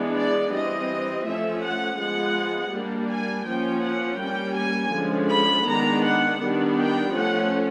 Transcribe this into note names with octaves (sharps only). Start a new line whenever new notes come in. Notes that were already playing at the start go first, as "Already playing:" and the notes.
Already playing: E3 G#3 B3 D4
D5
E3 G3 C4 D#5
F3 A3 C#4 E5
F#5
F3 G#3 B3 F#5
G3 A#3 D4
G#5
F3 A#3 C#4 G5
F#5
G3 A#3 C#4 G5
G#5
D3 F3 G#3 C#4
B5
D#3 G#3 B3 D4 A#5
F#5
D#3 G3 B3 D4
G5
F3 A3 C#4 F#5